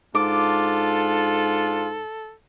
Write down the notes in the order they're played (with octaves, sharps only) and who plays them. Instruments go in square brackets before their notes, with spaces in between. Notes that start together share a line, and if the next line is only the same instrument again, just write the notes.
[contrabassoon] G#2 [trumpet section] D4 F4 [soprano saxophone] A4 [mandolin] D6